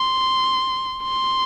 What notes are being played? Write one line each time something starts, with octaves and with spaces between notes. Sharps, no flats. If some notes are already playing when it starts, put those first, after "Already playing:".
Already playing: C6
C6